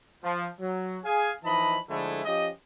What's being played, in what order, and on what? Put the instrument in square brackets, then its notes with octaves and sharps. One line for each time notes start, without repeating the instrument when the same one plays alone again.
[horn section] F3
F#3
G#4 F5 G#5
E3 F3 D#4 D#5 A5 B5
D3 F3 G#3 A3 E4
F3 C#4 G4 D#5